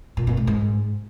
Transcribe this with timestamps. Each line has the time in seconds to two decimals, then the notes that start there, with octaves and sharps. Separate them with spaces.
0.17 A#2
0.27 A#2
0.37 A2
0.47 G#2